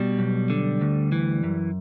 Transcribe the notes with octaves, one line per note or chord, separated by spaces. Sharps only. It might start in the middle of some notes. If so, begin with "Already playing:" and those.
Already playing: B2 G3
B1
D3
D2
E3
F#2